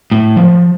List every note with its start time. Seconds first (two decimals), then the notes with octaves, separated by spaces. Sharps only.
0.12 A2
0.37 F3